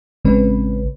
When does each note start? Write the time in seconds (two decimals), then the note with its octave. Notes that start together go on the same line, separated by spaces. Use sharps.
0.25 A1 C#3 G#3 C4 C#4 B4